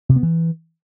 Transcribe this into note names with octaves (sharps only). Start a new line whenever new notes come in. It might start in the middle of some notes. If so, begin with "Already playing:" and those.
C3
B3
E3